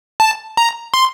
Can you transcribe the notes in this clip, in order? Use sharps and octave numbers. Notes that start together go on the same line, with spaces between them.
A5
A#5
C6